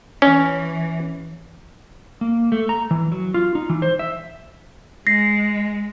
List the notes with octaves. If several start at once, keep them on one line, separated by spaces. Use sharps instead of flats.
E3 C#4
A#3
A3
A#5
E3
F#3
F4
D#4
E3
C5
E5
G#3 A#6 C7